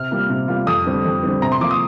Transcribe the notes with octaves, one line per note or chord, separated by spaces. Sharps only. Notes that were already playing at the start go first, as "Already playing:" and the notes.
Already playing: C3 F6
G3 A#3 F4
C3
G3 A#3 F4
F2 D#6
D3 G3 C4
F2
D3 G3 C4
C3 A#5
C6
F3 A#3 D6
D#6